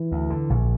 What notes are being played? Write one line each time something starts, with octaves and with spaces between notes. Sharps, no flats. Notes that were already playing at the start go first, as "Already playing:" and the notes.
Already playing: E3
D2
D3
A#1